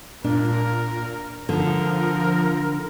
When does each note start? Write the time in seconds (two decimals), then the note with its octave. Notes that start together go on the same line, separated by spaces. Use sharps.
0.24 A#2 D4 A#4
1.49 D3 F3 A#4